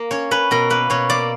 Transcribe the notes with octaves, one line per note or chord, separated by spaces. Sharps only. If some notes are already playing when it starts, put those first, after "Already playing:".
Already playing: A#3
C#4 C#5
C#4 B4
B2 A#4
A#3 B4
B2 C#5
A#3 D5